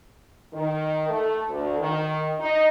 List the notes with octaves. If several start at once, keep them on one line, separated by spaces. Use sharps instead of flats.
D#3
A3
D2
D#3
D#4